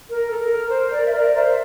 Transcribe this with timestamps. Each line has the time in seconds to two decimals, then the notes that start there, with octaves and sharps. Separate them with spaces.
0.10 A#4
0.31 A4
0.39 A#4
0.68 C5
0.90 A#4 D5
1.05 E5
1.12 A#4 D5
1.34 C5 E5
1.48 E5